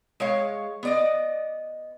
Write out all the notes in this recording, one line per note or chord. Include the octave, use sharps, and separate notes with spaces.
G#3 C#5 F5
B3 D5 D#5